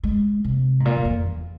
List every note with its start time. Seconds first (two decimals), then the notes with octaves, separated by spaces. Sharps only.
0.03 G#3
0.44 C3
0.80 G#2
0.85 A#2
0.96 E2
1.05 F2
1.26 E2